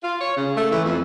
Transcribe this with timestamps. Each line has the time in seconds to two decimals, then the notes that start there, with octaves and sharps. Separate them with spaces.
0.03 F4
0.21 C#5
0.37 C#3
0.56 A3
0.71 E3
0.85 F2